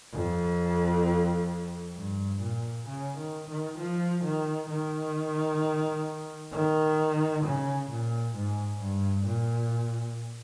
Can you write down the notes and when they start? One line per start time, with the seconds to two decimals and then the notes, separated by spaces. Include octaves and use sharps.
0.14 F2
1.95 G2
2.41 A#2
2.86 C#3
3.17 D#3
3.48 D#3
3.78 F3
4.24 D#3
4.70 D#3
6.53 D#3
7.44 C#3
7.89 A#2
8.35 G#2
8.80 G2
9.25 A#2